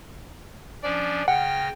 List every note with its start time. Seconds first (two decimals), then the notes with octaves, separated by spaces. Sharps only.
0.83 F3 C#4 D4 D5
1.28 C#3 F#5 G5 F6 A#6